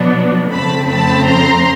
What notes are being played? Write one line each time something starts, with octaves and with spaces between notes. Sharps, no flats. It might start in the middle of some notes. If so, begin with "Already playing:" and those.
Already playing: B2 F#3 B3 D4
F2 C#3 F3 A3 C4 A5 B5
A5 B5
A#5 C6